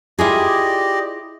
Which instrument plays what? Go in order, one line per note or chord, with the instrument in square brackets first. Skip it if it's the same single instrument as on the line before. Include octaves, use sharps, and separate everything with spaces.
[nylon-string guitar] E4 F4 G#4 [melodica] G4 D5 D#5